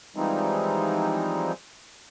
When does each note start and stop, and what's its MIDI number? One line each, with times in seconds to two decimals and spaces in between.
0.16 1.52 52
0.16 1.52 53
0.16 1.52 55
0.16 1.52 56
0.16 1.52 60
0.16 1.52 63